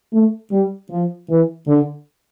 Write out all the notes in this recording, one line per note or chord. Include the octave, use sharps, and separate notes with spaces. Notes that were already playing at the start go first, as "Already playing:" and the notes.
A3
G3
F3
E3
D3